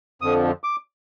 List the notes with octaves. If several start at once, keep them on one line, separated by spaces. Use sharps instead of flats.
F2 D3 F3 D#6
D6